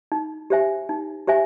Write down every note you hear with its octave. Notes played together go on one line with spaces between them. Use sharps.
D#4
G4 C5 E5 G#5
D#4
G4 C5 E5 G#5